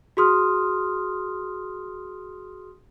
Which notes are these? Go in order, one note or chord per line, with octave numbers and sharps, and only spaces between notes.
F#4 G#4 C6 D#6 F6